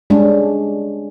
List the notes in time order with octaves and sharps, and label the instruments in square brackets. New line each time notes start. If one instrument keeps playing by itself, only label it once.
[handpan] G3 G#3 C#4 D4